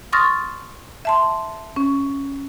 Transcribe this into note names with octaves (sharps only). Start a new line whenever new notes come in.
C6 C#6 D#6 F6 A6 A#6
E5 A5 C6
C#4